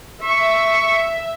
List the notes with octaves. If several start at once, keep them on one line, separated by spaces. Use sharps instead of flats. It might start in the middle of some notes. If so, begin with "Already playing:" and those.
E5 C#6